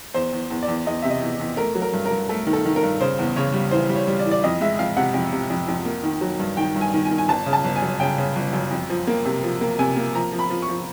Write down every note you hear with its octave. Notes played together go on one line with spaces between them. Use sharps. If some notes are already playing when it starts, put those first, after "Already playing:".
E2 C5
E2
E2
D5
E2
E2 D#5
C3 E5
D#5
E2
E2
A3 A#4
F#3
A#4
G2
A#4
G2
A3 A4
D#3
A4
D#3
A#4
G2
C#3 C5
E2
C#3 C#5
G3
E3 C5
G3
C#5
G3
D5
E3
D5
F2 D#5
G#3 E5
F2 F5
C3 F#5
F2
C3
F2
F2
A#3
D#3
F#3
G2
D#3 G5
G2
G#5
D#3
G#5
D#3
G#5
G1 A5
C#3
A5
G1
G#5
F#2
C#3 G5
C#3
G1
F#2
F2
F3
A#3
C3
F3
A#3
C3 G#5
A#3
F3 A#5
F3
B5
F3
C#6
F3